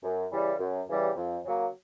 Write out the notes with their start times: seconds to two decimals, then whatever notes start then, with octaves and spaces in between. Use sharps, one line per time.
0.03 F#2
0.32 C#3 E3 G3
0.59 F#2
0.88 C#3 E3 G3
1.16 F2
1.44 C#3 F#3 A#3